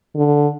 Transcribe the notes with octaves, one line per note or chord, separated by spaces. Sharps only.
D3